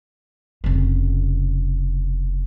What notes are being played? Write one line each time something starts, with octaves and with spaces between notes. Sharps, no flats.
F1 C#3